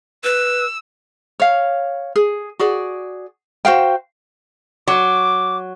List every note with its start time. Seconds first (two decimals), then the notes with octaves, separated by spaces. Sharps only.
0.24 B4 E6
1.40 C#5 F5
2.16 G#4
2.59 F#4 G#4 D5
3.65 F#4 C5 F5 G5
4.87 F#3 D6